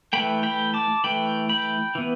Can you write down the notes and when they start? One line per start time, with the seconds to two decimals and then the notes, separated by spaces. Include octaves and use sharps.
0.13 E3 A3 G5 B5
0.43 G5 B5
0.74 A5 D6
1.04 E3 A3 G5 B5
1.49 G5 B5
1.95 E3 B3